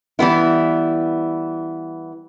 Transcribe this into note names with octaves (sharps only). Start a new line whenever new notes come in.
E3 G3 B3 E4